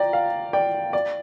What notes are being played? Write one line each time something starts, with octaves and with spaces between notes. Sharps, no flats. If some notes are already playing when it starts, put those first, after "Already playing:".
Already playing: D5 G5 A#5
F5
D5 G5
D5